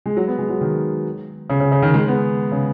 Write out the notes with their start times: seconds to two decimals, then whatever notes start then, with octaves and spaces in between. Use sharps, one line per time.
0.06 G#3
0.17 F#3
0.28 B3
0.39 G#3
0.49 F#3
0.61 D#3
1.50 C#3
1.60 C#3
1.72 C#3
1.82 D#3
1.94 G#3
2.08 B3
2.52 C#3